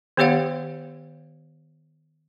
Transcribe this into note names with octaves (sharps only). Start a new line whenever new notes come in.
D#3 B3 G4 C#5 F5 F#5